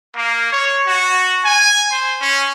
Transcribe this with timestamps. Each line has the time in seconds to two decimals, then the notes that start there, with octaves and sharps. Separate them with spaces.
0.15 A#3
0.51 C#5
0.86 F#4
1.45 G#5
1.90 C5
2.21 C#4